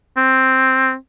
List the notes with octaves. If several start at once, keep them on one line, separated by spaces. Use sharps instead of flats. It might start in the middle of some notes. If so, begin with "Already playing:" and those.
C4